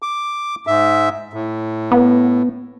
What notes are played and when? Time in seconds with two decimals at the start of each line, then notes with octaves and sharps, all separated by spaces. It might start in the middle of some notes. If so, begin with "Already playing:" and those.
0.02 D6
0.67 G#2 E5
1.33 A2
1.92 B3